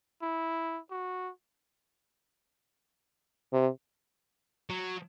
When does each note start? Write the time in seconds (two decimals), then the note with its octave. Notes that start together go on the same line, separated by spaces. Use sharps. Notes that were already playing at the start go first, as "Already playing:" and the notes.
0.22 E4
0.90 F#4
3.53 C3
4.70 F#3